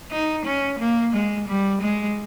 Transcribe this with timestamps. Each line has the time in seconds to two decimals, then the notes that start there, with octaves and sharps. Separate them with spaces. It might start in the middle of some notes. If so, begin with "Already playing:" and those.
0.11 D#4
0.45 C#4
0.79 A#3
1.13 G#3
1.48 G3
1.81 G#3